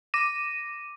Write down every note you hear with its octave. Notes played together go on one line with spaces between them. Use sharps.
D6 A#6 D#7 E7